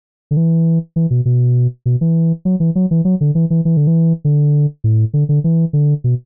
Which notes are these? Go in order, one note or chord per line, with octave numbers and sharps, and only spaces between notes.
D3
E3
E3
B2
B2
B2
E3
F#3
E3
F#3
E3
F#3
D3
E3
E3
E3
D3
E3
D3
A2
D3
D3
E3
D3
B2